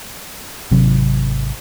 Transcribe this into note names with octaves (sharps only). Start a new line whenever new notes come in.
G#1 C3 F#3